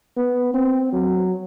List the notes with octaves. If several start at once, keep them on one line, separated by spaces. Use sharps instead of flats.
B3
C4
F#3